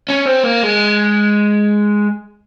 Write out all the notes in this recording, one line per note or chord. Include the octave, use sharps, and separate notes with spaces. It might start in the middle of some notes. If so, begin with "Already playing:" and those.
C#4
C4
A#3
G#3